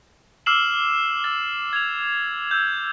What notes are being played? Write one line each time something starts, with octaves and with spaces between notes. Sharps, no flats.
D6 E6 F6 C7 E7 F#7
E6 F6 A6
G#6 F7
E6 G6